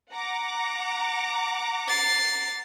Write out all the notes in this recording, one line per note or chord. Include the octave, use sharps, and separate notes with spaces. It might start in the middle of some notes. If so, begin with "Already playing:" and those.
F#5 A#5 D6
A6 C7